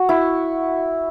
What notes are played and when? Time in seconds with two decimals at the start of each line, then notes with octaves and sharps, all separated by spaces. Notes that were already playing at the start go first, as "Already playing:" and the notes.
Already playing: F#4
0.09 E4